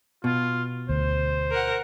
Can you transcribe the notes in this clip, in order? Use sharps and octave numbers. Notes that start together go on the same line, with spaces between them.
B2 F4
D2 C5
A#4 F#5